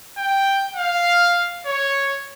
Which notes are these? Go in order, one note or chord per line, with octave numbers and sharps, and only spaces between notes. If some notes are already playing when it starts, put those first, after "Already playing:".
G5
F5
C#5